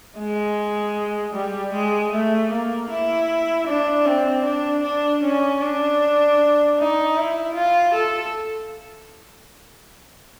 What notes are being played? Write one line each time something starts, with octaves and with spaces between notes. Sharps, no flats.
G#3
G3
G#3
A3
A#3
E4
D4
C4
D4
D4
C#4
D4
D#4
E4
F4
A4